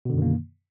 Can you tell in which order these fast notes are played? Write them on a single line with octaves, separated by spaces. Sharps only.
B2 D3 F#2 D#3 A#3